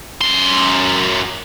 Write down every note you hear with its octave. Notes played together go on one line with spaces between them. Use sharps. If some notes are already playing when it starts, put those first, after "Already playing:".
F#2 C6